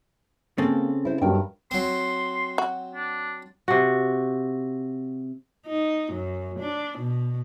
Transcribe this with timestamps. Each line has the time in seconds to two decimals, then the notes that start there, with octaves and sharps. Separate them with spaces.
0.58 C#3 A#3 C4 A4
1.05 E4 C5
1.21 G2 F#3 A#4 D#5 G5
1.71 F#3 C4 C6
2.58 F#4
2.95 D4
3.68 C3 F#4
5.66 D#4
6.13 F#2
6.59 D4
6.99 B2